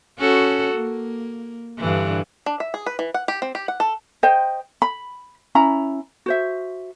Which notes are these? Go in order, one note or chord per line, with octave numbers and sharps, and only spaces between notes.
C#4 F#4 A4
A#3
G2 D3 E3
D4
E5
G#4
B4
E3
F#5
G4
C4
G4
F#5
A4
C5 D#5 G5
B5
C#4 E4 A#5 B5
F#4 C5 E5